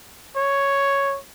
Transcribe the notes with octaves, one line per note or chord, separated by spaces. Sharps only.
C#5